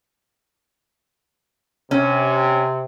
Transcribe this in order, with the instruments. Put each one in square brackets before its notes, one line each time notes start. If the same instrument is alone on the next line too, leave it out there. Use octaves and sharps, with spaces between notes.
[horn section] C3 [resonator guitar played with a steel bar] C#4